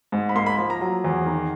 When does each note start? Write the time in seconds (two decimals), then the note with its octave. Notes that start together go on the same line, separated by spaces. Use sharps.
0.12 G#2
0.29 B5
0.35 A#3 C6
0.46 B5
0.58 F3
0.70 A#5
0.81 F#3
1.04 E2
1.26 D#3